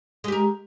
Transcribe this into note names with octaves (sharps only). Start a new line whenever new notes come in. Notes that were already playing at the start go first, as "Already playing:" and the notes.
G#3 G4 A#4